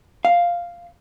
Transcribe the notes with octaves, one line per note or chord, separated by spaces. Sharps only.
F5